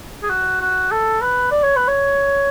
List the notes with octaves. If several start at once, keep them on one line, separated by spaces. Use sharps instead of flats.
G#4
F#4
F#4
A4
B4
D5
C#5
B4
C#5